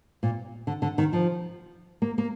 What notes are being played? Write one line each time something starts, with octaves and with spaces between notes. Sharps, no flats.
A#2
D3
D3
D#3
F3
A#3
A#3